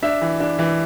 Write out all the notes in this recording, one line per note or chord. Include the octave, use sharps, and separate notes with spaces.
D4 E5
E3
D4
E3